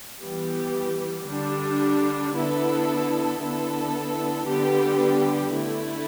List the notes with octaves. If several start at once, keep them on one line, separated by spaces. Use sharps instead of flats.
E3 G3 B3 G4
D3 G3 D4
D3 B3 E4 A4
D3 B3 E4 A4
D3 G3 B3 G4
D3 A3 E4